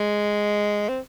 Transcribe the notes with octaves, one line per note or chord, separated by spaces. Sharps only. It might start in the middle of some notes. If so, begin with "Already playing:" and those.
Already playing: G#3
C4